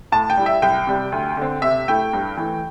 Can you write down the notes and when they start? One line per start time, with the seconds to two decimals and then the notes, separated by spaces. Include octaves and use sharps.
0.12 A2 A5
0.30 G5
0.37 G3 E4
0.46 E5
0.62 C2 G5
0.87 C3 G3
1.12 D2
1.37 D3 C4
1.62 C3 E5
1.88 A3 E4 G5
2.13 G2
2.37 E3 A3